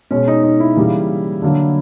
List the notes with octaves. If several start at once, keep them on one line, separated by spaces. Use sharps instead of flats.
B2 G#3 C#4
D#4
D#4
E4
C#3 E3 G3 A#3
D3 F#3 A#3